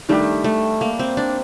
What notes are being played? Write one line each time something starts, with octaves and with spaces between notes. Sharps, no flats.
D#3 G3 A3 D4 G4
A3
A#3
C4
D4